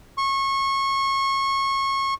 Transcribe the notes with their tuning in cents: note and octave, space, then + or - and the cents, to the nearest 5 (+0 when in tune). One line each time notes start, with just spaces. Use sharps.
C#6 -25